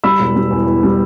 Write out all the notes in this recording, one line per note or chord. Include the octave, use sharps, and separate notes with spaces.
G3 B5 E6
E1
G3
E2
E2
G3